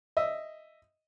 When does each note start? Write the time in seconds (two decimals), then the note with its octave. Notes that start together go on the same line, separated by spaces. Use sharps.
0.17 D#5 E5